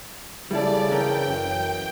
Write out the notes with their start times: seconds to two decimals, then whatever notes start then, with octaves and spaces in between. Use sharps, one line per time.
0.51 C#3 G3 E4 A4 D5
0.91 E3 C#4 A#4 G5
1.27 F#2